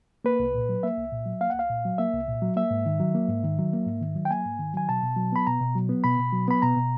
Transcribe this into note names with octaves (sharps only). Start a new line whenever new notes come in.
A#3 B4
C2
A#2
F#3
A#3 E5
C2
A#2
F#3
A#3 F5
F#5
C2 F5
A#2
F#3
A#3 E5
C2
A#2
F#3
A#3 E5
G#2
D#3
F#3
A#3
G#2
D#3
F#3
A#3
G#2
D#3
F#3
G5
A#3 G#5
G#2
D#3
F#3 G#5
B2 A5
B2
F#3
B3 B5
B2 A#5
B2
F#3
B3
B2 B5
B2
F#3
B3 B5
B2 A#5
B2